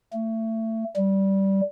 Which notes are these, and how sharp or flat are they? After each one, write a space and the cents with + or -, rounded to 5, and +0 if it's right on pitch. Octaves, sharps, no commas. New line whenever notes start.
A3 +25
G3 -15